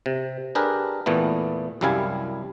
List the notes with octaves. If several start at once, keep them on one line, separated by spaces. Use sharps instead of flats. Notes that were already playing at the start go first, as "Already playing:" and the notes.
C3
D4 G4 G#4 A#4 B4
E2 A#2 E3 A3 B3
C2 F#2 G3 E4 F5 G#5